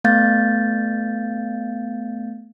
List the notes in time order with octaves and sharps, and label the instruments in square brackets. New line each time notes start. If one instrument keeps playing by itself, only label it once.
[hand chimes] A3 B3 F5 G6 A6